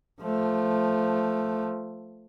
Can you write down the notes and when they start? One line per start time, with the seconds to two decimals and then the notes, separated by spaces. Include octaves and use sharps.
0.22 F3 A3